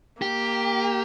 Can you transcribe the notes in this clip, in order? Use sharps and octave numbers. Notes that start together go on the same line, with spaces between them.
A#3 G4